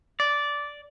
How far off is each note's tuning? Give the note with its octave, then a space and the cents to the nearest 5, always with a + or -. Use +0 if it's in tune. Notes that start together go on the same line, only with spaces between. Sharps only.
D5 -10